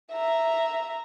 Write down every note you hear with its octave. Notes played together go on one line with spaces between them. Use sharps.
E5 A#5